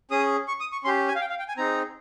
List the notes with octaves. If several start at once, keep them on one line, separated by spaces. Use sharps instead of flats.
C#4 G#4 D#6
C#6
D#6
C#6
C#4 G4 C6
G#5
F5
G5
F5
G5
G#5
C4 D#4 G#4 A#5